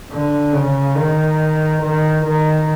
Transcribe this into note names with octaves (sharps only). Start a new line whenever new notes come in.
D3
C#3
D#3
D#3
D#3